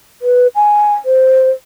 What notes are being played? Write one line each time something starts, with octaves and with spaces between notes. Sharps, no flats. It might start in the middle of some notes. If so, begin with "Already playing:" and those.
B4
G#5
C5